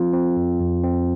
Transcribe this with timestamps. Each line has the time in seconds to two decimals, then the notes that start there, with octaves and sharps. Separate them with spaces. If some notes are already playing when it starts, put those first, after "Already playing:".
Already playing: F3 C4 F4
0.13 C4
0.36 F2
0.60 F2
0.83 C4